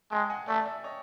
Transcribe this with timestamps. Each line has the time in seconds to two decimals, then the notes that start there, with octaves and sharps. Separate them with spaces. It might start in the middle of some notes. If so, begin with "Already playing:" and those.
0.11 G#3 G5 A5
0.30 F#5 G#5
0.47 A3 D5
0.66 D5 E5
0.84 C#5 D#5